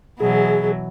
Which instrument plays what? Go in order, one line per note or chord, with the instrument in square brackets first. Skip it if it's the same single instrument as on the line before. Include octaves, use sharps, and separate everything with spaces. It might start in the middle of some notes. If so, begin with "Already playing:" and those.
[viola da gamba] B2 E3 F#3 [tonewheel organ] G#4